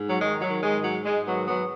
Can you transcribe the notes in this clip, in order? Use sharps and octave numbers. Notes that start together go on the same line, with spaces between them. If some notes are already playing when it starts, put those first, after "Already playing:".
Already playing: G#2
F#3
D#3 G#3
F#3
D#3
G#3
G#2
F#3
G#2 G#3
F#3 B3
D#3
F#3 B3